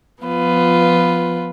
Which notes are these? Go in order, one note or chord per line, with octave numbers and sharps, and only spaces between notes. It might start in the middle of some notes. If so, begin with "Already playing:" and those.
F3 B3 F4 B4